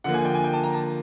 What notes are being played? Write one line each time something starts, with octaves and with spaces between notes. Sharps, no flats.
D3 F3 A#3 F#5
G#5
G5
G#5
G5
A5
A#5
A5